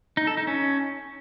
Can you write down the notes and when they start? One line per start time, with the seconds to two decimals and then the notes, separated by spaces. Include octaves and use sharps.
0.17 D#4
0.27 A4
0.37 D#4
0.47 C#4